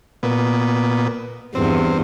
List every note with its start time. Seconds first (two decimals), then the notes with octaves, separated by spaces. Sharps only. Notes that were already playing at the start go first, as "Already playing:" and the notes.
0.23 A#2 B3
1.55 E2 G2 C4